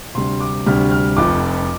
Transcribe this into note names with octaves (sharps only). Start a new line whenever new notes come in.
D2 C3 G3 C6
D6
D2 C3 G3 F6
F6
F1 F2 F3 D6